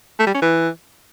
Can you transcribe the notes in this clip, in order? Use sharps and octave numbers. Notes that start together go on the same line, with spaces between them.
A3
G3
C#4
E3